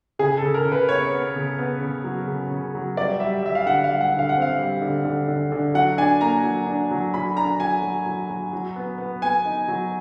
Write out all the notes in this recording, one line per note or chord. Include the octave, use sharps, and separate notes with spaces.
C#3 G#4
A4
C#3
A#4
C#3
B4
B3 C#5
B3
C#3
B3
C#3
F#3
C#3
C#3
F#3
G3 D5
G3 E5
G3 E5
F5
D3 F#5
F5
G3
F#5
D3
F5
F#5
C4
F5
G3
D3
D3
D3
D3
F#3 F#5
D4 G#5
A#3 A#5
F#3
D4
F#3
F#3 B5
D4 A#5
F#3 G#5
F#3
F#3
F#3
F#3
B3
B3
B3 G#5
D#4
F#3